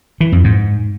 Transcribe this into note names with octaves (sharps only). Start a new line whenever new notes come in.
E3
F2
G#2